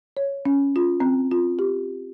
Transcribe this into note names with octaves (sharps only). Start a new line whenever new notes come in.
C#5
C#4
F4
C4
F4
G4